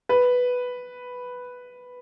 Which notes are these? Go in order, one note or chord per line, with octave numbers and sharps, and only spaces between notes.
B4